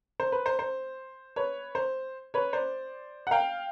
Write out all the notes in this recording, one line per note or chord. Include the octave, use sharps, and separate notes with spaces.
C5
B4
C5
C5
B4 C#5
C5
B4 C#5
C5 D5
F#5
F5 G5